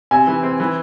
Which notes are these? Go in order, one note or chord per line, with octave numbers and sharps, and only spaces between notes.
C3 G#5
E3
C4
E3